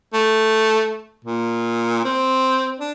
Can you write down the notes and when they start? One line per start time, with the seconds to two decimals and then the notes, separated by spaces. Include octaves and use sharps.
0.14 A3
1.25 A#2
2.04 C4
2.79 D4